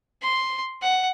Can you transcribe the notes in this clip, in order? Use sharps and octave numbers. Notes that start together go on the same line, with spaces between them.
C6
F#5